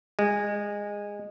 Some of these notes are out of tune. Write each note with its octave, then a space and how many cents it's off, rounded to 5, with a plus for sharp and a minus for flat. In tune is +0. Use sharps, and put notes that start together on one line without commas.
G#3 -20